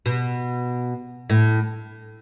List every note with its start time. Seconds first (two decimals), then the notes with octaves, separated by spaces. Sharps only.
0.06 B2
1.30 A2